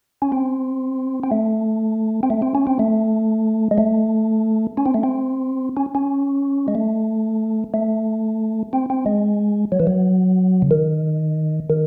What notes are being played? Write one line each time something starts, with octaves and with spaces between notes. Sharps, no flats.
C#4
C4
C4
A3
C4
A3
C4
C#4
C4
A3
G#3
A3
C#4
C4
A3
C4
C#4
C#4
G#3
A3
A3
C4
C4
G#3
F#3
E3
F#3
C#3
D#3
D#3